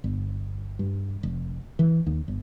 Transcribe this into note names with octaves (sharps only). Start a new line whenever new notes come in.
G1
G2
F1
E3
D#2
G1